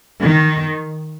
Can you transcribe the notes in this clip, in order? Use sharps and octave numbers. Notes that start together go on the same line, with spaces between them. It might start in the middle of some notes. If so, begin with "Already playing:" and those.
D#3